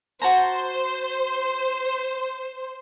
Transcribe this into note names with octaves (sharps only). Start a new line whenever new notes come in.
F#4 C5 A5 A#5